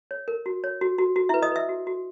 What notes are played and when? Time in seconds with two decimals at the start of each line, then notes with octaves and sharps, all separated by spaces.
0.11 C#5
0.28 A#4
0.46 F#4
0.64 C#5
0.81 F#4
0.98 F#4
1.16 F#4
1.29 E4 E5
1.34 B4
1.42 D#5 D#6
1.52 B4 E5 E6
1.69 F#4
1.87 F#4